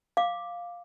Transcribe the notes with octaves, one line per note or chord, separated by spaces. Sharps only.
F5 D6